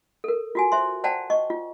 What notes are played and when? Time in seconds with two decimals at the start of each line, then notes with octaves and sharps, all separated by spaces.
0.24 A4 A#4
0.55 F4 F#4 G#5
0.72 C5 E5 C6
1.04 C5 D5 F#5 G5 A5 A#5
1.30 D#5 C#6
1.50 F4